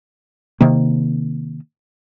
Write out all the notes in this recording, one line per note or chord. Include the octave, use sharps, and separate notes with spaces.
C3 D#3 A#3